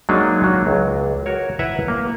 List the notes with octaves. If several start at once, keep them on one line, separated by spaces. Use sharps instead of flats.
F#3 G#3 A#3 D4 D#4
F#3 A#3 D4
C#2
F#4 A#4 C#5
E4 B4 E5 F#5 A#5
A#3